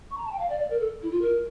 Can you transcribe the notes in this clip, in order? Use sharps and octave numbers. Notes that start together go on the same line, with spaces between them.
C#6
A#5
A5
G5
F5
D5
D5
A#4
A4
E4
F4
A#4